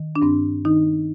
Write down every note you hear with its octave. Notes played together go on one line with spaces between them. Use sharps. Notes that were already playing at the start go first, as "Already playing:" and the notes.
Already playing: D#3
D4
G2 C4
D#3 D#4